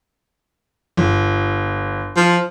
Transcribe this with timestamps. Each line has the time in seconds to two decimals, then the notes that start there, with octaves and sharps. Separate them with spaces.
0.97 G1
2.16 F3